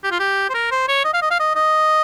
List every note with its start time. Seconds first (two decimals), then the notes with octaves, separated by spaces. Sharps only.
0.03 G4
0.11 F4
0.19 G4
0.50 C5
0.54 A#4
0.71 C5
0.88 C#5
1.04 D#5
1.14 F5
1.22 D#5
1.31 F5
1.40 D#5
1.56 D#5